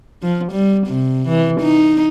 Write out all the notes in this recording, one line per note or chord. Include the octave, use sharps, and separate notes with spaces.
F3
G3
C3
E3
D#4